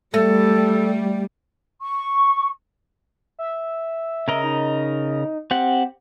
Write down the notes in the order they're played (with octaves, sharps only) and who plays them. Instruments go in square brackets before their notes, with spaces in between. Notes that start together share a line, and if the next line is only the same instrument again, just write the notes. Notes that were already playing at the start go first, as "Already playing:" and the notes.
[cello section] G3 [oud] A3 [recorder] A4
[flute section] C#6
[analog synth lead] E5
[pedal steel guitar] C#3 A#4 D#5
[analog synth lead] D#4
[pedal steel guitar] C4 G4 F#5